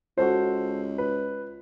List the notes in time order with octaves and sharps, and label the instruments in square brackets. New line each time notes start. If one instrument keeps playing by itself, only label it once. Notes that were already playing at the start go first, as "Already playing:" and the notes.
[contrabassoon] C#2 [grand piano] F#4 A4 C5
[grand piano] B4